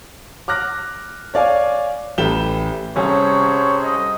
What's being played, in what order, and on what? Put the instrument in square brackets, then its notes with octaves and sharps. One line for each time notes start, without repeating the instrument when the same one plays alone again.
[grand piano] D6 F6 F#6 A#6
C#5 D5 F5 G#5
A1 G4 A4 B4 E7 G7
[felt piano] C2 C#4 [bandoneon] G#4 A4 C5 [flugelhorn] C#5
[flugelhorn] D#5